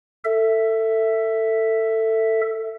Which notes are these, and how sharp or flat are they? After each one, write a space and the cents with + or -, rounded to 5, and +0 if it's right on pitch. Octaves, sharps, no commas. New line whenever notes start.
A4 +20 E5 +0